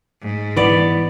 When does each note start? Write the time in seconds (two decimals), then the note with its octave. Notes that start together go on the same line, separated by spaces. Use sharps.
0.21 G#2
0.57 E3 B3 D5